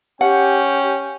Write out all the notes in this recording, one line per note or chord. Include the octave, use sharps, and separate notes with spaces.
C#4 G4 F#5 G5